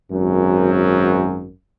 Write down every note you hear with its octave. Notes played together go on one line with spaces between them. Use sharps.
G#1 F#2